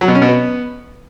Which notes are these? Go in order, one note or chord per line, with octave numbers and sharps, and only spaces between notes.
F#3
B2
C#4
B2
B3